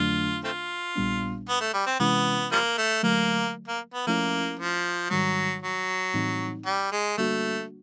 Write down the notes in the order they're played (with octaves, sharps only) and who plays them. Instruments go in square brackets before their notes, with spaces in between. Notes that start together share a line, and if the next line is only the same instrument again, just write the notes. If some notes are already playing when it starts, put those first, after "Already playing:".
Already playing: [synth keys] F2 D3 F#3 A3 D4 [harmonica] F4
[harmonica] A3 C4 F4
[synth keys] A#1 A#2 G3 B3 D4
[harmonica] B3
A3
G3
C4
[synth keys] C3 E3 G#3 C#4 E4 [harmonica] B3
[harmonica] F3 G3 A#3
A3
[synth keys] D3 F#3 A3 [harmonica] A#3
[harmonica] A#3
B3
[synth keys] F3 A3 C#4 E4 [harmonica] A#3
[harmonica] F3
[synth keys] G#2 D#3 G3 [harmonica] F#3
[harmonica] F#3
[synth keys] A2 E3 G3 C4 D#4
[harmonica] G3
G#3
[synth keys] D3 G3 A#3 D4 F#4 [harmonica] A3